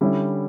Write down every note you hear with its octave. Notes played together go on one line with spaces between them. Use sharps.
D3 G3 C#4 E4